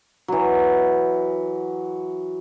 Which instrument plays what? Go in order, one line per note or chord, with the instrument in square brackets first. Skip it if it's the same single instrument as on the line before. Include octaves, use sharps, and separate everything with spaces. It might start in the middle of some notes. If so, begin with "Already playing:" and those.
[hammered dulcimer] E3 F#3